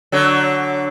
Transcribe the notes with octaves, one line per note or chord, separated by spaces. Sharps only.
D3 F#3